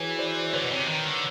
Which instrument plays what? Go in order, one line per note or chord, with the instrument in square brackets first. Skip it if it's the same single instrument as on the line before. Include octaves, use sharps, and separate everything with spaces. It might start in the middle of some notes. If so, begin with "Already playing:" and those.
Already playing: [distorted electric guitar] E3 [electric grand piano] F#4 G#4 B4 C#5
[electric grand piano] C5 D5
[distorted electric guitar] D3 [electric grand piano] B4 C#5
[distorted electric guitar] B2
C3
D#3
D3